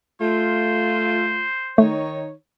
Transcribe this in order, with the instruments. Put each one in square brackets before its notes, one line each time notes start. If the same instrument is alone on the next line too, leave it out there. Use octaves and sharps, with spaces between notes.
[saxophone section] A3 F4 [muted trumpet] C5
[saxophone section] D#3 D#4 C#5 [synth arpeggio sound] A3